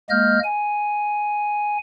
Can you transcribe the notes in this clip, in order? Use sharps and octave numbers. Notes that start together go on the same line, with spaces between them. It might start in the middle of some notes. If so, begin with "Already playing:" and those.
G#3 A#3 D#5 F6 G6
G#5